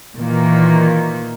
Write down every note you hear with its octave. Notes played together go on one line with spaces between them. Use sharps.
A#2 D#3 E3 A#3